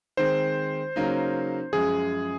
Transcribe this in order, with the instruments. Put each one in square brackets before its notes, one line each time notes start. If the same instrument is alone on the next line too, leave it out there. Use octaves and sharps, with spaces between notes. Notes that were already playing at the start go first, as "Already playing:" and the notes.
[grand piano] D#3 G#3 C4 [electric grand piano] C5
[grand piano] C#3 F#3 A#3 D#4
[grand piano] F#2 F3 G#3 [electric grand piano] G#4